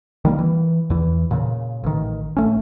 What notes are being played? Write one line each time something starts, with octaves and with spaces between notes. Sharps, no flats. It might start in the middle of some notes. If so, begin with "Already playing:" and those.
D#3 G3 A#3
E3
E2 E3
A#2 C#3
A1 D#3
A1 A3 C#4